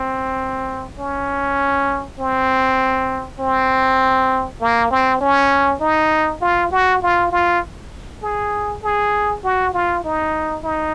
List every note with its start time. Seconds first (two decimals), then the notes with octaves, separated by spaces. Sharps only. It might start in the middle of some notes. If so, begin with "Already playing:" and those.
Already playing: C4
0.99 C#4
2.20 C4
3.40 C4
4.61 A#3
4.91 C4
5.21 C#4
5.81 D#4
6.42 F4
6.72 F#4
7.02 F4
7.32 F4
8.23 G#4
8.83 G#4
9.44 F#4
9.74 F4
10.04 D#4
10.64 D#4